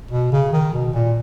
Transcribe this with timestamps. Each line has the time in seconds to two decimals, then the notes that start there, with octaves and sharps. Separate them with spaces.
0.11 B2
0.32 C#3
0.53 D#3
0.73 B2
0.94 A#2